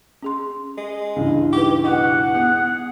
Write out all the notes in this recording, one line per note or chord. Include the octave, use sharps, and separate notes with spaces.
C#4 G#4 C6
G#3
C#2 G2 E3
D#4 G4 B4
B2 F#5
B3 G#4